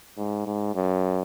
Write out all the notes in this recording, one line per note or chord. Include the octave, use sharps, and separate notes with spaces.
G#2
G#2
F#2